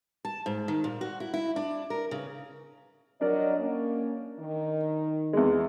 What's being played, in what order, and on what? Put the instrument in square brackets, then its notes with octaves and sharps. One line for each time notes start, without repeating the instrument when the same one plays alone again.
[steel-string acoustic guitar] A5
G#2
D#3
A#2
F#4
E4
E4
D4
A#4
C#3
[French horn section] F#3 D#5 [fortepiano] D4 A#4 D5
[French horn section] A#3 C#4
D#3
[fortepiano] E2 G#3